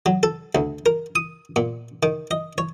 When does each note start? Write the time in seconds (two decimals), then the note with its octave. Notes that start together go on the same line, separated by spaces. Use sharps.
0.06 F#3
0.23 A4
0.55 D2
0.86 A#4
1.15 D#6
1.56 A#2
2.03 D#3
2.31 D#5
2.58 C#5